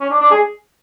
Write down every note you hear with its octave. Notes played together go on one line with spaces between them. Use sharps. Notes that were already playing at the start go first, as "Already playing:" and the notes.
C#4
D4
D4
G#4